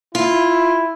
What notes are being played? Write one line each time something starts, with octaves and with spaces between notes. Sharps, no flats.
E4 F4